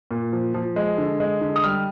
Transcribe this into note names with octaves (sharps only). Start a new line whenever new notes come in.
A#2
F3
F3
G#3
D3
G#3
D3
D#6
G3 F6